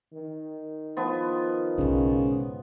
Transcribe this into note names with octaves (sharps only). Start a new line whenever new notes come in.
D#3
F3 B3
B1 G#2 C#3